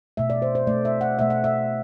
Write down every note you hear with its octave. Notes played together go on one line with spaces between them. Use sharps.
B2 A3 E5
D5
C5
C5
B2 A3 D5
E5
F#5
B2 A3 E5
F#5
E5